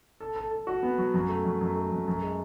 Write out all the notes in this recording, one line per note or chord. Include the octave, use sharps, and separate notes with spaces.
A4
A4
A4
F#4
B3
F#3
F#2
A3
F#2
F#2
A3
F#2
F#2
G#3